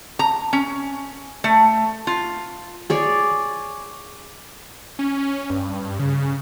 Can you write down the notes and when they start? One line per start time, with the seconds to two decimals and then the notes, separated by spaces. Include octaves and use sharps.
0.19 A#5
0.53 C#4
1.44 A3
2.07 F4
2.90 G#4 C#5 D5
4.99 C#4
5.50 G2
5.99 C#3